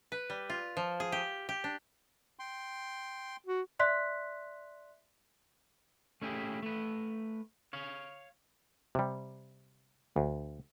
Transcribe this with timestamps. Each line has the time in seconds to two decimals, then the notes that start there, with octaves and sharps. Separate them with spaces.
0.12 B4
0.30 G3
0.50 F4
0.77 F3
1.00 G#4
1.12 G4
1.49 G4
1.64 D4
2.39 G5 C6
3.46 F#4
3.79 D5 E5 C6 F#6 B6
6.22 A3 C#4 E4 G4 G#4
6.63 A3 B4
7.73 C#5 F5
8.95 C3 G3
10.16 D2